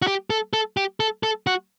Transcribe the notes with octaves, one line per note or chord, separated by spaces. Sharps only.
F#4
G4
A4
A4
G4
A4
A4
F#4